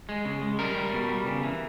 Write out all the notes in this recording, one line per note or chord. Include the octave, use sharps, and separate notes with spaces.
G#3
C#3
G#3
G3 A#4
G3
B2
G3
C#3
E3